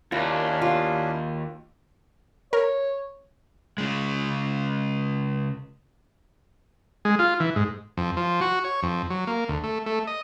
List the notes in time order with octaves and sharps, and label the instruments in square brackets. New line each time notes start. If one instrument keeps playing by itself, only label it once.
[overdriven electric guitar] D#2 [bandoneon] C#4 D4 E4 [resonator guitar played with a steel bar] F4
[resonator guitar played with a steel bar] F4
[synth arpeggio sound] A#4 [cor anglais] C#5
[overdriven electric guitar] C#3 G#3
[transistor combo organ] G#3
F4
E3
G#2
F2
F3
F#4
C#5
F2
F#3
A#3
D2
A3
A3
D#5